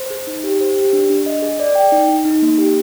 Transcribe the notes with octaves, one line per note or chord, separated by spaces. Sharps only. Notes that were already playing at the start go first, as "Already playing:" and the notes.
Already playing: C5
G#4
D#4
G4
C5
G4
D4
D4
D#5
G#4
D5
G5
D#4
D#4
D#4
A#3
G4